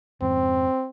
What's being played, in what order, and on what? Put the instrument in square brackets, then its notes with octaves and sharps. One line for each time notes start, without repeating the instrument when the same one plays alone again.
[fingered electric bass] F2 G#2 C#3 [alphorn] C4